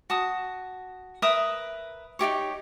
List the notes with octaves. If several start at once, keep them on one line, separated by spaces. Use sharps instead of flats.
F#4 A5 D#6
A#4 B4 E5 D#6
D#4 F4 G4 C#5